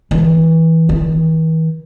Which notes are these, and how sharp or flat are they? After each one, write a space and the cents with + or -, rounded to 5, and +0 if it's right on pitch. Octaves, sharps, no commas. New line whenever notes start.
E3 -20
E3 -45